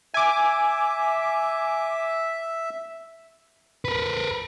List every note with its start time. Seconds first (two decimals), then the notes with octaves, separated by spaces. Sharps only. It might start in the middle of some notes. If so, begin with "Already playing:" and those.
0.14 E5 G#5 D6
3.85 A#4 B4